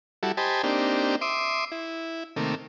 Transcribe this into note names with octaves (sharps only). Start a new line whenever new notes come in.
G3 E4 F#4 A4
G4 C5 D#5 G#5 A5 B5
A#3 C4 D4 D#4 G4
E5 C6 D6 D#6
E4
C3 D#3 A3 A#3